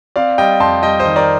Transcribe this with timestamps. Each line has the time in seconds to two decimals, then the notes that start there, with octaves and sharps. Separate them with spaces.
0.16 C4 D5 F5
0.38 G3 D#5 G5
0.60 F2 A5 C6
0.83 G3 D#5 G5
1.00 C5 D#5
1.05 D#3
1.16 A#4 D5